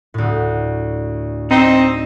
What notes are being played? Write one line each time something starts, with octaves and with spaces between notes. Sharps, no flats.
D2 A2
C4 D#4